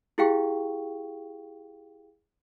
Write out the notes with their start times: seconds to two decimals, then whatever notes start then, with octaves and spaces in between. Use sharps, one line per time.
0.18 E4 G4 G#4 F5 G5 C#6